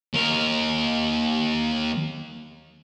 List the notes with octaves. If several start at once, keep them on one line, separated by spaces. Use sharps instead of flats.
D#2 A#4